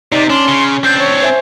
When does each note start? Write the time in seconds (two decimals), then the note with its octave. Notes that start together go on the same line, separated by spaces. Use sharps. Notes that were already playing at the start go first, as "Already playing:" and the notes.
0.12 C3 D#4 D5
0.30 C#4 D4 C6
0.48 C#3
0.84 C4 D4 G6
0.99 C#5
1.22 C5 E5 G#5